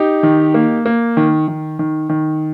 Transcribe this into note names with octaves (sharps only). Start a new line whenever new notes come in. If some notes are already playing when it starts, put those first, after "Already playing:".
Already playing: D#4 G4
D#3
A#3
A#3
D#3
D#3
D#3
D#3